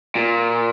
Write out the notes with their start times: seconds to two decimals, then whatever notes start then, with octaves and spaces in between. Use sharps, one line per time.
0.15 A#2